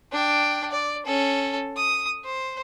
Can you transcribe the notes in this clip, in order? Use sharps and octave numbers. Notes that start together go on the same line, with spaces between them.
D4 G5
D5
C#4 A4
D#6
C5